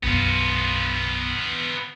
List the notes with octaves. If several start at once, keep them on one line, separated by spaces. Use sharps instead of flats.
B1 F#2 B3 F4